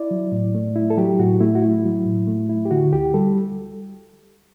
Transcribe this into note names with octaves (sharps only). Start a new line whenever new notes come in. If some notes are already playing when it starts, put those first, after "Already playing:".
Already playing: E4 D5
F#3
A2
A3
E4
A4
F#3 G4
A2 F#4
A3 E4
F#4
E4
F#3
A2
A3
E4
G4
D3 F#4
D2 G4
G3 A4